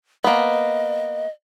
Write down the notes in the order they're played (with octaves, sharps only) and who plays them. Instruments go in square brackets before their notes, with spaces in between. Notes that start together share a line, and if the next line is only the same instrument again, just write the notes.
[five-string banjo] A#3 B3 [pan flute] D#5